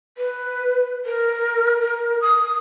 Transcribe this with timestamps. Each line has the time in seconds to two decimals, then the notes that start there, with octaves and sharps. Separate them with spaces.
0.18 B4
1.06 A#4
1.81 A#4
2.21 D#6